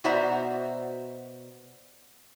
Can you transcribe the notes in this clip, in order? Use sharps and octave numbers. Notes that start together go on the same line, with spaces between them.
B2 F#4 C5 D5 E5 A#5